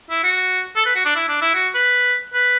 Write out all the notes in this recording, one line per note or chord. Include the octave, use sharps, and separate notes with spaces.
E4
F#4
A4
B4
F#4
D4
E4
D4
E4
F#4
B4
B4